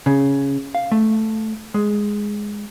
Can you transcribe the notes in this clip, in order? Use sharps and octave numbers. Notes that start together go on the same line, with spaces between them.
C#3
F5
A3
G#3